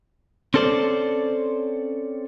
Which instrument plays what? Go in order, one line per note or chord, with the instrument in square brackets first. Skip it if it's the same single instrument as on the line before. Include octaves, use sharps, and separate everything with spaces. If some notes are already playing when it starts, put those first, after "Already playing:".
[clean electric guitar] C4 C#4 A4 C5 D5